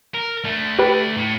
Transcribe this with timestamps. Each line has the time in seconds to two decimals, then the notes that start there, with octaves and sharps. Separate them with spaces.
0.14 A#4
0.44 A3 D4
0.79 G4 B4
1.17 A2